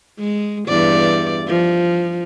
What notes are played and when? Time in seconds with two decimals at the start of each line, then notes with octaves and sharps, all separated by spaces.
0.19 G#3
0.68 E2 G2 D5
1.47 F3